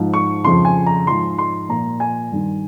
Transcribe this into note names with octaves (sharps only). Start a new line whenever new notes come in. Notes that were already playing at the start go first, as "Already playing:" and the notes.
Already playing: G#2 F3
C#6
F2 C#3 F3 C6
G#5
A#5
G#2 F3 C6
C6
A#2 F3 A#5
G#5
G2 D#3